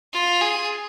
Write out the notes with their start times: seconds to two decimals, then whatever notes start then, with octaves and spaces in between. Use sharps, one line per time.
0.13 F4
0.41 G#4